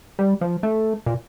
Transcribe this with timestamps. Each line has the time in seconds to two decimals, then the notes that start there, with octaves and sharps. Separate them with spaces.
0.19 G3
0.41 F3
0.63 A3
1.06 A#2